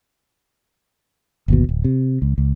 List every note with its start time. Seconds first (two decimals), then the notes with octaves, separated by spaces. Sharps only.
1.48 G1 D#2 B2
1.69 D1
1.84 C3
2.22 C#2
2.38 C#2